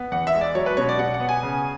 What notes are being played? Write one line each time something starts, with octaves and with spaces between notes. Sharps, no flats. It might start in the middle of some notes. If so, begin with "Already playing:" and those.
Already playing: B3
E2 F#5
E5
G#3
D5
F#3 C#5
B4
B2 C#5
D5
B2 F#5
F#5
B3
G#5
C#3